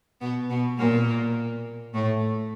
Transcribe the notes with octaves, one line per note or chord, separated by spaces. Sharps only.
B2 B3
B2 B3
A#2 A#3
A2 A3